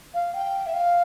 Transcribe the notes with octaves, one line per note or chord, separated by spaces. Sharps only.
F5
G5
E5
F5